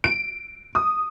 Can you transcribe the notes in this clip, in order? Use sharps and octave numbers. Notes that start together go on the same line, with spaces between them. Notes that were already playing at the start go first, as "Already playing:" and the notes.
D7
D#6